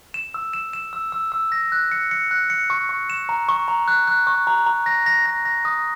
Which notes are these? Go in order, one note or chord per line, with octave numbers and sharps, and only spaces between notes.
E7
E6
E7
E7
E6
E6
E6
A#6
F#6
C#7
C#7
F#6
C#7
C#6
C#6
E7
A#5
C#6
A#5
F#6
F#6
C#6
A#5
A#5
A#6
A#6
A#6
A#6
D#6